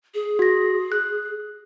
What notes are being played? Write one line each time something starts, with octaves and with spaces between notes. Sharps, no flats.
G#4
F#4 A#6
F#6